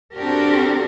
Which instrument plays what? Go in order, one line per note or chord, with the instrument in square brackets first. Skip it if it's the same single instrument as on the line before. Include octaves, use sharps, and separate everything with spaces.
[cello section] C4 D4 F#4 G4 A4 A#4